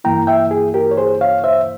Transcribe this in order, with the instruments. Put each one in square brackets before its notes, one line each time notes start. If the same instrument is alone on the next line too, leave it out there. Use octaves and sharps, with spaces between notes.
[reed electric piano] G2 E3 A#3 E4 G5 A#5
E5 G5
G#4
G4 A#4
C#5
G#4 C5
C#5 F5
C5 E5